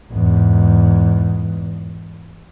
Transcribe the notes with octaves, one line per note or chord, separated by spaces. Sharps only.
E2 G#2